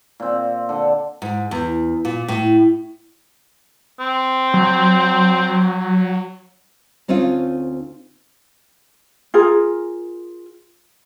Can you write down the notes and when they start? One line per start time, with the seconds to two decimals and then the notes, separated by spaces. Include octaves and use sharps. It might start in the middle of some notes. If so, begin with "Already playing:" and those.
0.20 A#2 C4
0.69 D3 A4
1.22 G#2
1.51 E2
2.05 A#2
2.28 A2
4.00 C4
4.54 F#3
7.08 D2 C4 C#4 D#4 F4
9.34 F4 G#4 A#4